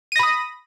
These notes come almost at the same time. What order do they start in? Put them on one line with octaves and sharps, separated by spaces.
D#7 A#6 B5 D#6